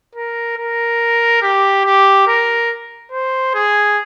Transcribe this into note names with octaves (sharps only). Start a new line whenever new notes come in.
A#4
A#4
G4
G4
A#4
C5
G#4